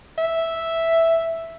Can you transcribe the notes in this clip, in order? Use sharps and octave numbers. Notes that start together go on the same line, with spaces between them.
E5